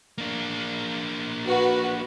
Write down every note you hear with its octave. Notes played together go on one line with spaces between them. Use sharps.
A#3 D4
F#4 B4